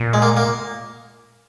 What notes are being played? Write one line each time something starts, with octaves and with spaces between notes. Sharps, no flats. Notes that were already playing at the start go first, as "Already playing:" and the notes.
Already playing: A#2
G#3
A#3
A#3